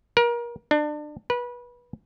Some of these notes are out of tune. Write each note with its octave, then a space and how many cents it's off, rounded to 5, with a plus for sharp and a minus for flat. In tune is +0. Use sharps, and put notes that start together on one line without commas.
A#4 +30
D4 +30
B4 -25